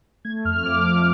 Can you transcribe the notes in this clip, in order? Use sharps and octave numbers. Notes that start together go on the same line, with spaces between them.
A3 G#6
F2 F6
F3 D6
F2